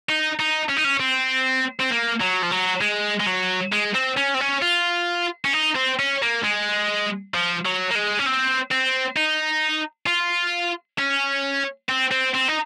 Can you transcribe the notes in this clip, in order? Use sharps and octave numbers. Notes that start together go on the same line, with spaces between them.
D#4
D#4
C#4
D#4
C#4
C4
C4
A#3
F#3
F3
F#3
G#3
G#3
F#3
G#3
C4
C#4
C4
C#4
F4
C#4
D#4
C4
C#4
A#3
G#3
F3
F#3
A#3
G#3
C#4
C4
C4
D#4
F4
C#4
C4
C4
C4
D#4